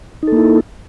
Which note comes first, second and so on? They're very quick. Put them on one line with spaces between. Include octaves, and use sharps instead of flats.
D#4 A4 A#3 E4